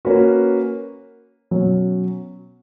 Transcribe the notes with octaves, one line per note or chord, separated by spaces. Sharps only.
A#3 C#4 F#4 B4
B2 F#3 C#4